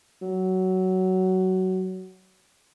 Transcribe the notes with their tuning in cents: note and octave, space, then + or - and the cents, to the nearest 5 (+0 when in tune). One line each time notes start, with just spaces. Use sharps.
F#3 +15